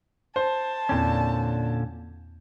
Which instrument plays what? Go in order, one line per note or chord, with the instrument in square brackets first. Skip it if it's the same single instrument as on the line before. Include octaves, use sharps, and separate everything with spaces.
[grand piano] C5 [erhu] A5
[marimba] E2 C4 [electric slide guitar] A#2 D3 C#4